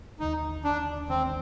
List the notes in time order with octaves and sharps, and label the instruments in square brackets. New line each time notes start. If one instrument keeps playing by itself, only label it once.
[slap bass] D#2 D3 G#3 [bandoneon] D#4
[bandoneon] D4
[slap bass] D#2 D3 G#3 [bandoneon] C4